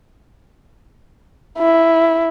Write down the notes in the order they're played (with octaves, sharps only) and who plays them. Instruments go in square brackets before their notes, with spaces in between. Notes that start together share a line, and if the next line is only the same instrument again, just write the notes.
[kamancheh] E4